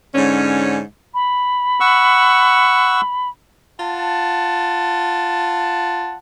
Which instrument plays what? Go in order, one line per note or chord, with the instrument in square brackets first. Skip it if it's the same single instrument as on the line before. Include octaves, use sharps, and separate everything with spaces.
[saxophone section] G#2 D3 C#4
[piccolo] B5
[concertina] F#5 C#6 E6
[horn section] F4 F#5 A5